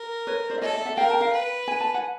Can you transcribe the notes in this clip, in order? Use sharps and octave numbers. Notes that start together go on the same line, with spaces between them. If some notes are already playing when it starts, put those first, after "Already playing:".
Already playing: A#4
B4 C#5
C5 D5
E5
A4 C#5 D#5
D5 E5
E5 F#5
A#4 F5 G5
G5 A5
F5 G5
B4
G#5
A5
F#5 G#5